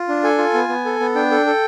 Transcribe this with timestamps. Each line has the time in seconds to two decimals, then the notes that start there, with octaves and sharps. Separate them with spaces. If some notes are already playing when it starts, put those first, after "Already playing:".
Already playing: F4
0.09 D4
0.23 A4 G#5
0.38 F4
0.54 B3
0.69 B3
0.85 A4
1.00 B3
1.15 D4 G5
1.31 A4
1.46 A4